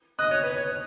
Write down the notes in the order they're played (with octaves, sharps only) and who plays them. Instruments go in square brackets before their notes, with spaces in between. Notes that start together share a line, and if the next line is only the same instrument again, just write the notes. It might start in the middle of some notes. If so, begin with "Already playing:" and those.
[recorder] D#5 [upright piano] D#6 F#6
[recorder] C#5
B4
C#5